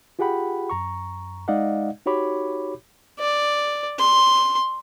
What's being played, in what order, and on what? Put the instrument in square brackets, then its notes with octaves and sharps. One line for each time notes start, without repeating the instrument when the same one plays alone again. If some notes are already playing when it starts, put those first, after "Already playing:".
[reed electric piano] F4 G4 G#4 F#5 G5 B5
F#2 A#5 C#6
G#3 D#4 D5 D#5 F5 F#5
D#4 F#4 G4 C#5 B5 D6
[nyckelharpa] D5
C6